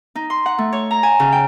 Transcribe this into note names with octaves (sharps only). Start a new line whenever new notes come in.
D#4
C6
F#5
A3
C#5
A#5
G#5
C#3
G5